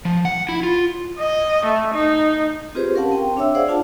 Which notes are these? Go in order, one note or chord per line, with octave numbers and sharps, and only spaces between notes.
F3
F#5
E4
F4
D#5
A3
D#4
C4 F4 G4 G#4 B4 C5
C#4 G4 A#4 F5 F#5 A5
C4 G5
D4 C#5 E5 E6
G#4 C5 D5 F5 F#5
D4 F4 F#5 A5